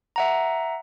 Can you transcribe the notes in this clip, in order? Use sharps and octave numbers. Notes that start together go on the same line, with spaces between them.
E5 F#5 A#5